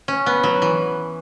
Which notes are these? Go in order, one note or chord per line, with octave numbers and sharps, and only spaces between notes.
C#4
B3
F#3
E3